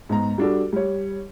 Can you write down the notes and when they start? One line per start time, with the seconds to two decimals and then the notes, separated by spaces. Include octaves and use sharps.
0.09 G#2 B3 A#5
0.38 G3 D4 F#4 A4
0.73 G3 C#5